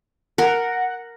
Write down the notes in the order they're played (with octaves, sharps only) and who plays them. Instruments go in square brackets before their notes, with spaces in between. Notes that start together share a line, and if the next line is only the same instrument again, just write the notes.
[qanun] A#4 [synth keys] F#5